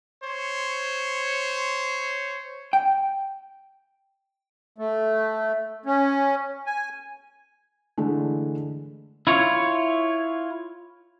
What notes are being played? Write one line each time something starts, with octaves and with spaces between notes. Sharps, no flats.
C5 C#5
G5
A3
C#4
G#5
D3 E3 G#3 A3
E4 F4 C#5